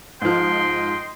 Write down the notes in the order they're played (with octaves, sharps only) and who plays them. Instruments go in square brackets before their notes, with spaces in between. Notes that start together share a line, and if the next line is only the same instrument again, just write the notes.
[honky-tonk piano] G#2 F3 [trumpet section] D#5 G5 C6